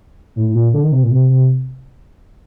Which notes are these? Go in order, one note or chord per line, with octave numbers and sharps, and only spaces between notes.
A2
A2
A#2
D3
D#3
C3
A#2
C3
C3